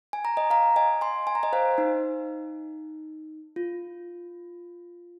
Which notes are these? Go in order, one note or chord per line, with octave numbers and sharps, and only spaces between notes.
G#5
A#5
D#5 G#5
F5 A#5
D#5 G#5
G#5 C6
G#5
A#5
D#5 G#5
C5 F5
D#4
F4